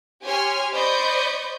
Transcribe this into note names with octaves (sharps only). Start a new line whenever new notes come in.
G4 C#5 G#5 C6 F6
C5 D5 D#5 B5 C#6 G6